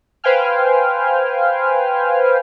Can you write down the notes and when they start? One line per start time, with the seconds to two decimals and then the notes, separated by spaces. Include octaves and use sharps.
0.24 B4 C5 F5 G5 G#5 F6